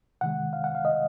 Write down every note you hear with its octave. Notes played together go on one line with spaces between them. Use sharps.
C3 D#3 G#3 F#5
F5
F#5
F5
D#5